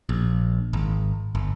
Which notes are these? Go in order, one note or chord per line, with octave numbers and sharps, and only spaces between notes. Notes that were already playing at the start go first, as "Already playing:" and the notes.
A#1
G#1
G1